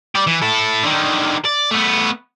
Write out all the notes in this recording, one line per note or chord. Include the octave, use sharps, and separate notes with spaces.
G4 D5
E3
E4 A4
D3 D#3
D5
A3 B3